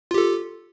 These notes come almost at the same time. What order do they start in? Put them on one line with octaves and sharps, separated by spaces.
F4 G4 A4